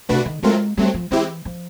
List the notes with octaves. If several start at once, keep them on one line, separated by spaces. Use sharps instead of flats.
C3 A3 D4 F#4 B4
D#3
F#3 G#3 A3 C4 F4 A#4
F#3 G3 A3 C4
F3
E3 G#3 C4 E4 G4
F3